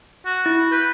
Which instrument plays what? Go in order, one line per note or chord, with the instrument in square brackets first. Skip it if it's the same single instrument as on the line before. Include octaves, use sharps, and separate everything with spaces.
[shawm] F#4
[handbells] E4
[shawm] B4 [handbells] G6